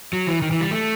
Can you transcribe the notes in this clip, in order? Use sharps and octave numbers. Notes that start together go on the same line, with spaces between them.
F#3
E3
D#3
E3
G3
A3